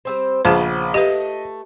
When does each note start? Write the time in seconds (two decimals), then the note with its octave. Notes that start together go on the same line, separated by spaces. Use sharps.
0.05 G3 C4 C5
0.45 A#1 C#3 F3 B3 C5 A5
0.94 A3 G4 B4 D#5